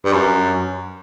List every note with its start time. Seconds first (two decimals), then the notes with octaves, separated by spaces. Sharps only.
0.05 G2
0.12 F#2